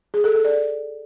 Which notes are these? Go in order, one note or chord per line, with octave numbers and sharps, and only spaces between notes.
G#4
A4
A4
D5